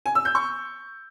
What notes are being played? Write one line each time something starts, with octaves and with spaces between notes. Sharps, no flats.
G#5
E6
G6
C#6